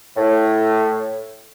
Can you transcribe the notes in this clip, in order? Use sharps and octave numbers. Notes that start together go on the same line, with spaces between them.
A2